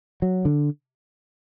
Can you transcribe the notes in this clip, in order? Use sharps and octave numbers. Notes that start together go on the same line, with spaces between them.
F#3
D3